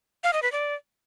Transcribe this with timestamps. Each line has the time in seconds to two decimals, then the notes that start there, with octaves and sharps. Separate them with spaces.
0.24 F5
0.33 D#5
0.43 B4
0.52 D5